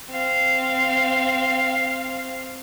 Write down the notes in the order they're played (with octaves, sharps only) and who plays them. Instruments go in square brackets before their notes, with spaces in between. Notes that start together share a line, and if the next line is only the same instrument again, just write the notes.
[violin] C4 F5